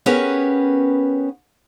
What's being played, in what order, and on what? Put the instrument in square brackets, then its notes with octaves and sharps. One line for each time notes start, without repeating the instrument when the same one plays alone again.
[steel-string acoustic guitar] B3 C#4 G4 G#4 A#4 B4